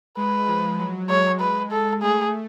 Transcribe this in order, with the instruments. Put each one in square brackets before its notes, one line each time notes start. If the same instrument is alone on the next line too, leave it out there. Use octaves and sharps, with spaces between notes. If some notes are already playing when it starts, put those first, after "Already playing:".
[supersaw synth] G#3 [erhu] B4
[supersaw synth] F3
F#3
[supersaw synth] G#3 [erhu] C#5
[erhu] B4
A4
[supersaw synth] A3 [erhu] G#4